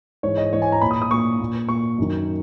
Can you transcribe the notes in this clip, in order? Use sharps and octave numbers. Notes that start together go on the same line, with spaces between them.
G#2 E3 C#5
D#5
G#2 E3 C#5
G#5
A#5
A#2 B5
D#6
D#6
A#2 C#6
A#2
A#2 C#6
F#2 D#3